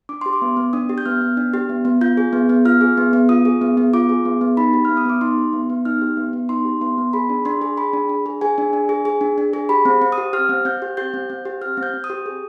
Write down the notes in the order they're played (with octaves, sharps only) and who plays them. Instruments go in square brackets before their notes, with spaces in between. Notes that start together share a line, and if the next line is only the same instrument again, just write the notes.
[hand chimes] D4 D6
G4 C6
D6
B3
B3
D4 D#6
G4
G6
B3 F6
B3
D4
G4
B3
B3
F4 G6
G#4
B3
B3
F4 F6
G#4
B3
B3
F4 D#6
G#4
B3
B3
F4 D6
G#4
B3
B3
D#4 B5
G4
B3 F6
D#6
B3 D6
D#4 C6
G4
B3
B3
D#4 F6
G4
B3
B3
D#4 C6
G4
B3 C6
B3
G#4 B5
D4
D4 C6
G#4
G#4 B5
D4
D4
G#4
G#4 G#5
D4
D4
G#4
G#4
D4
D4
G#4
G4 B5
C4
C4
D#6
G4
G4 F6
C4
C4 G6
G4
G4 G6
C4
C4
G4
G4 F6
C4
G6
C4
D#6
G4
G#4